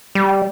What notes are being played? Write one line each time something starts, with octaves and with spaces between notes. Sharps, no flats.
G3